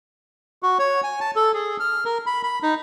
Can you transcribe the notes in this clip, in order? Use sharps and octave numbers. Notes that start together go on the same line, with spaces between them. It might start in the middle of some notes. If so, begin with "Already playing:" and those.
F#4
C#5
G#5
A5
A4
G#4
F6
A#4
B5
B5
D#4